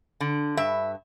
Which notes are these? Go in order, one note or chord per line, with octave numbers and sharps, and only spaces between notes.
D3
G2 E5